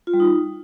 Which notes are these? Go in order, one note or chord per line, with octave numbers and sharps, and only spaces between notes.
F4
G3
D#4